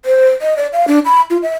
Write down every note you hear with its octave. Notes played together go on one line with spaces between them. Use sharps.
C5
D#5
D5
F5
D4
B5
F4
E5